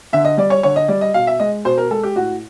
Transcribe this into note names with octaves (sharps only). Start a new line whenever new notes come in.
D3 E5
D#5
G3 D5
C#5
D3 C#5
D#5
G3 D5
D#5
B2 F5
E5
G#3 D#5
B2 C5
A#4
G#3 A4
G4
A2 F#4